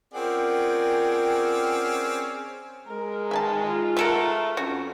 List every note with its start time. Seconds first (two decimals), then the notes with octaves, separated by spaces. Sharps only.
0.14 C4 C#4 F4 G#4 A#4 D5 F#5 G5
2.88 G#3 A#4
3.31 D#3 E5 G#5 A5
3.67 F4
3.97 A3 A4 A#4 E5 F#5
4.57 F2 C#4 F#4